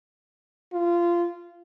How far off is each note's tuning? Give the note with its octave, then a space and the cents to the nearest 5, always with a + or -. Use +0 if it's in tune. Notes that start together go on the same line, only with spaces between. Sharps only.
F4 -20